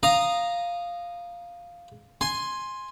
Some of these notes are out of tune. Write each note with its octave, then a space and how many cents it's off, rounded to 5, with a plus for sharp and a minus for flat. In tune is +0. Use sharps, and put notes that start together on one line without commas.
F5 +0 A#5 +0 D#6 -10
G#5 +0 C6 +5